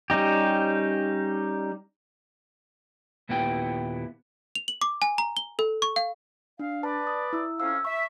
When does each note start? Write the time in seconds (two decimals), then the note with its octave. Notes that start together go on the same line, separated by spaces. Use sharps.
0.10 G3 C#4 D#4 G4
3.29 D#2 A#2 B3 E4 G4 G5
4.55 F7
4.68 F#7
4.81 D6
5.02 G#5
5.18 A#5
5.37 G7
5.59 A4
5.82 C#6
5.96 F5
6.59 D4 F5
6.83 B4 D5 A5
7.07 D#6
7.33 E4 E6
7.60 F2 C#4 F5 E6
7.85 E5 C#6